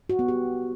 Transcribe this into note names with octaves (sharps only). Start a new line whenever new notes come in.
F#4
B3
G4